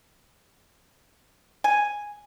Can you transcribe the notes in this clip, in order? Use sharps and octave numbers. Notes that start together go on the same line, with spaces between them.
G#5